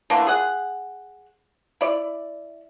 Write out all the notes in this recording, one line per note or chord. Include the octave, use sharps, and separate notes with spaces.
D3 E3 A3 A#3
G#4 F#5
E4 D5